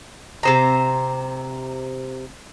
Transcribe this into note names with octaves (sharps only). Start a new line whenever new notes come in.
C3 C5 A#5